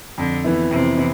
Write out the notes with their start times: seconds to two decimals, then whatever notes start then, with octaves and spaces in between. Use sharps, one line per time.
0.18 F2 D3
0.44 E3 B3 E4
0.71 F2 C3
0.97 E3 B3